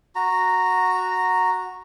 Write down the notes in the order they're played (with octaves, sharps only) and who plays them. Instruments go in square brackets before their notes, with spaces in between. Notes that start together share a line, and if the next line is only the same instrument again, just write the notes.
[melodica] F#4 A#5